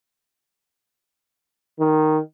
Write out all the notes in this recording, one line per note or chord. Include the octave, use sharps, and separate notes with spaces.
D#3